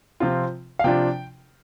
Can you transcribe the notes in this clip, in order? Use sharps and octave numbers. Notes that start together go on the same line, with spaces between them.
C3 F3 C4 F4
F5
C3 F3 D4 F4 G5